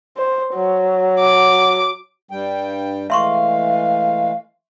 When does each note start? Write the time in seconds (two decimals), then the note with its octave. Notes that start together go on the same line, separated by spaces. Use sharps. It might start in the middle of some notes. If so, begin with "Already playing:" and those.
0.17 C5
0.54 F#3
1.20 D6
2.31 G2 G3 G5
3.10 E3 G#3 A3 E5 F5 C6 C#6